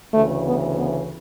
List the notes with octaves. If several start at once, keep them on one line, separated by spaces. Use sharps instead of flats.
D2 C#3 E3 A3
B3
B3